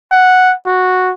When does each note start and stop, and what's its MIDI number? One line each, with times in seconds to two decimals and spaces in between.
0.12 0.54 78
0.66 1.13 66